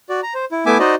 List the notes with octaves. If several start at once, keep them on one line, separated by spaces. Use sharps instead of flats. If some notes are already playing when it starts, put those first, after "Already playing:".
F#4 D5
A#5
C5
E4
A3 B3 E4 E5 G#5 D6
D#4 F#4 C5 D5 D#5